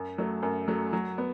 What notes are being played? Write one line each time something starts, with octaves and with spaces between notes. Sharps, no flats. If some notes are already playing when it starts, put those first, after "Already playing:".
Already playing: F#2
F#3 A3
F#2
F#3 A3
F#3
B3